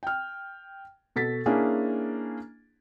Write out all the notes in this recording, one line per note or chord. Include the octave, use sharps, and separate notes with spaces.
G5 F6
B2 A4 A6 B6
A#3 C#4 D4 E4 G#4